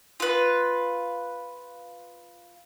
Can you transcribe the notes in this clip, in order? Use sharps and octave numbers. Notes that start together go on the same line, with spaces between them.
F4 B4